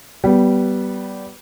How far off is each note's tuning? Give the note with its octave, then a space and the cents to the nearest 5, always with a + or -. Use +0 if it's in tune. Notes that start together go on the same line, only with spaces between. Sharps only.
G3 -20 B3 -5